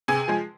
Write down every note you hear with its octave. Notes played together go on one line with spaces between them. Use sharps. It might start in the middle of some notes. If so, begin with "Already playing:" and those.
C3 G#4 G#5
F3 G#3